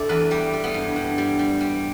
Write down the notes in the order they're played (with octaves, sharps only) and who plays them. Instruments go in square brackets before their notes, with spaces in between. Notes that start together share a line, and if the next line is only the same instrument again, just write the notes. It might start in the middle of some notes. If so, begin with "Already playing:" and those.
Already playing: [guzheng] D4 E4 G4 A4 D5
E2 B4
G3 G4
G3
B3
G2
G2
G3
G3
G3